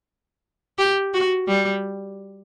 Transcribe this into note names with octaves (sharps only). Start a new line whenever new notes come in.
G4
F#4
G3